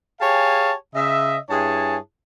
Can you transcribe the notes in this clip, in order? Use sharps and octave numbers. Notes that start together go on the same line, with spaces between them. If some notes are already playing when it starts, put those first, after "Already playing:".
G4 G#4 C#5 F5 G#5 A5
C#3 D#5 E5
G2 E4 G#4 C#5 G#5 A5